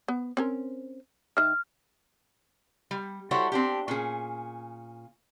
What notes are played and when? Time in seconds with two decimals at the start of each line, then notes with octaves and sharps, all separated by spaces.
0.08 B3
0.37 C4 C#4 A#4
1.37 D#3 E5 F6
2.91 G3
3.31 G3 E4 F#4 A4 C5 C#5
3.52 C4 D4 G4
3.88 A#2 C#4 G#4